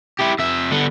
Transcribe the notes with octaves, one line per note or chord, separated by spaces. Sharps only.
E4 G4
F2 E5
D3 B3